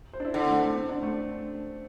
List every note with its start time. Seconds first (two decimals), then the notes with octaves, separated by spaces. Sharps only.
0.13 C5
0.20 D4
0.25 E4
0.34 D3 D4
0.43 C4
0.48 A3
0.62 A3
0.75 C4
0.89 D4
1.03 A3